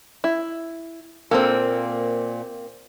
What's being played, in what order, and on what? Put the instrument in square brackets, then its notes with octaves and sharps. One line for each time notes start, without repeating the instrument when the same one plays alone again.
[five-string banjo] E4
[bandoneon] A#2 [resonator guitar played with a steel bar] A#3 C4 [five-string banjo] A4 A#4 C5